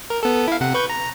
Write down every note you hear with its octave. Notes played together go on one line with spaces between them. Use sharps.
A#4
B3 A4
E4 F5
C3 F#5
B4 C#6 G6
A#5